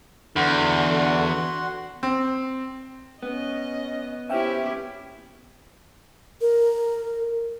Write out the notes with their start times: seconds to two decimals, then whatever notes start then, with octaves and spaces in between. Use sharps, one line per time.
0.36 E2 D3 F#4 F#5 C6
2.03 C4
3.23 B3 C#4 D#5
4.30 C#4 E4 G4 C5 E5 G5 F6
6.41 A#4